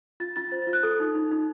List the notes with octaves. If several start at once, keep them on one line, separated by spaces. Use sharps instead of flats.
F4 A6
F4 A6
C5 A6
A6
F4
F#6
A4 D#6
D#4
D#4
D#4